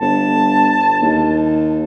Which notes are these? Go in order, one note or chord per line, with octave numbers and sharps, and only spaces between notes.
G1 A5
D#2